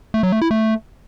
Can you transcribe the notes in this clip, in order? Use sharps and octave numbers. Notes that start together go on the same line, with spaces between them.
A3
F#3
A3
E4
A3